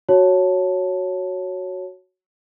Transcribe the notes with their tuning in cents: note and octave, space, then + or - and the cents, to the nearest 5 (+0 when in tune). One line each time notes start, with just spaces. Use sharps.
F#4 +0 C#5 +0 A5 +0